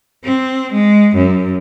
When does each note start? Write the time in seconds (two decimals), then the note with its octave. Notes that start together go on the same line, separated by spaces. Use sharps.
0.25 C4
0.73 G#3
1.16 F#2